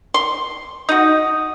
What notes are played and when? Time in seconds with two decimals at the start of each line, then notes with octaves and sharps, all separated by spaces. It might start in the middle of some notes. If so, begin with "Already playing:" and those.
0.14 C6
0.89 D#4 F#4 D#6